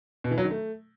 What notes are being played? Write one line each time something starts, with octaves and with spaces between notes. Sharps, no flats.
B2
E3
F#3
D#3
A3